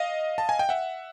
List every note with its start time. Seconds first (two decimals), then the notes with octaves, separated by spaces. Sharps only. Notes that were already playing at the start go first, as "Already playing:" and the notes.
Already playing: D#5 F5
0.38 A5
0.49 G#5
0.59 G5
0.69 E5 F#5